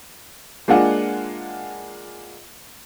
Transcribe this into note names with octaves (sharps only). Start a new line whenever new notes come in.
G#3 A#3 D4 F4 F#5 G#5